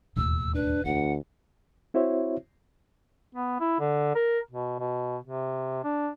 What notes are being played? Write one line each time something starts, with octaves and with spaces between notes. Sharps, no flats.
E1 D#2 A2 E6
D4 B4
D2 D3 F#5
C4 E4 F#4 C5 C#5 E5
B3
E4
D3
A#4
B2
B2
C3
D4